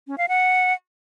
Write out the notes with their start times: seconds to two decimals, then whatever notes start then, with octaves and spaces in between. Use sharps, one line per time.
0.07 C#4
0.18 F5
0.28 F#5